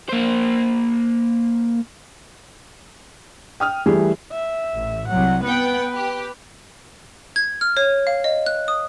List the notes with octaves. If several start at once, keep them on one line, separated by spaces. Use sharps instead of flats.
A#3 C5
G5 D#6 F6
E3 G3 A3 G4 G#4
E5
A1
C2 F#3 F#5
B3 B4 F#5 G5
G4
G#6
F6
C#5
F5
D#5
F#6
D#6